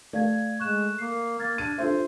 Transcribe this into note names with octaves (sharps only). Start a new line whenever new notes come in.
A3 D5 F5 G#6
G#3 C#6 F#6 E7
A#3 C7
A#3 F6 G#6 A6
D4 D#7
D4 F4 A4 C5 E5